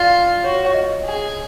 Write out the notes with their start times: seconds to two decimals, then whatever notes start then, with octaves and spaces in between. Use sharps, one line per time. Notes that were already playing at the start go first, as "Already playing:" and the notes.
Already playing: F4 D5
0.44 F#4 C#5
0.55 C#5
0.65 C#5
0.74 D#5
1.05 G#4